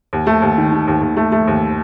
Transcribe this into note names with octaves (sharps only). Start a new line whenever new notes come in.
D#2
A3
D#2
D#3
D#3
D#2
D#2
A3
A3
D#2